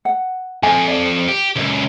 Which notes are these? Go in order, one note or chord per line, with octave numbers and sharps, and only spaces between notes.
F#5
F2 G#5
D5
G4
C#2 F#2